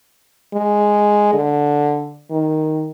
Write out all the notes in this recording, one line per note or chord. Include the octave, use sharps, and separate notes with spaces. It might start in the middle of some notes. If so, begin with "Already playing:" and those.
G#3
D3
D#3